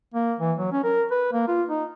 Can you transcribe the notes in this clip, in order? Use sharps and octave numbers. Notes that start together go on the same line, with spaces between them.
A#3
E3
F#3
C#4
A#4
B4
A#3
F4
D#4